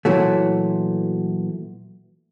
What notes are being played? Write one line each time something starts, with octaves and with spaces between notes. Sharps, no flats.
A#2 E3 F#3 A3